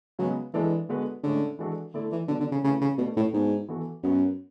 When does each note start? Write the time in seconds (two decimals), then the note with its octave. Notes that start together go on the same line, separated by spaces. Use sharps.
0.19 C#3 F#3 G#3 B3
0.54 E3 G#3 D4 A4 D5
0.89 D3 G#3 B3 F#4 B4
1.23 A2 D3 G#3 C#4 G#4
1.59 E3 G#3 D4 F#4 A4
1.94 D3 A3 E4 A4 D5
2.12 E3
2.28 B2 D3 F#3 B3 D4
2.40 D3
2.52 C#3
2.63 C#3 A3 E4 B4
2.81 C#3
2.98 B2 A3 D4 F#4 B4 D5
3.17 A2
3.33 G#2 B2 G#3 B3 D4 F#4
3.68 E3 B3 F#4 A4
4.03 F#2 F#3 B3 F#4